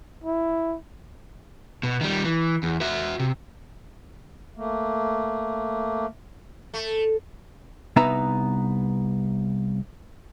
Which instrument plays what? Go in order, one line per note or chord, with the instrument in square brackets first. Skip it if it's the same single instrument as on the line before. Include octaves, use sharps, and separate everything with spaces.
[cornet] E4
[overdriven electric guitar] B2
D#3 G3
E3
E2
F#4 E5
C3
[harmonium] A3 A#3
[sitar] A3
[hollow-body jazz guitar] C2 B3 D#4 B4 E5 A#5